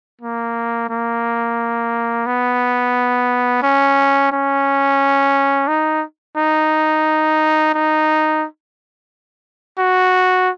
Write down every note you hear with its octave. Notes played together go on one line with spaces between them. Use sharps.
A#3
A#3
B3
C#4
C#4
D#4
D#4
D#4
F#4